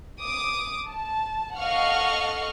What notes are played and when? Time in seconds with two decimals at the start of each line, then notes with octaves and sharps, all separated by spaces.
0.21 D6 D#6
0.88 A5
1.59 A4 D#5 F5 F#5 C#6 F6